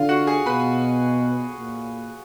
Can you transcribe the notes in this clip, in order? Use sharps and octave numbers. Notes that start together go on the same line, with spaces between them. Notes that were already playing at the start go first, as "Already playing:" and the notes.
Already playing: D3 F4 F5
F#4 F#5
G#4 G#5
B2 B4 B5
A#2